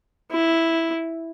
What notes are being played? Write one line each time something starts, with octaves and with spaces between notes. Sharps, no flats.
E4